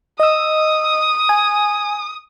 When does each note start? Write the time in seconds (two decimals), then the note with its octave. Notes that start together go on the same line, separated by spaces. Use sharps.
0.20 D#5 D#6 E6
1.29 G#5